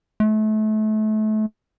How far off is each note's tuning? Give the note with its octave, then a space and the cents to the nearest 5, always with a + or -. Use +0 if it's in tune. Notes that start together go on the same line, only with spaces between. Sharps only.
A3 -30